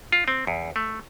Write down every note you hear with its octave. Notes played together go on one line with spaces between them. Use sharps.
F4
C4
E2
A3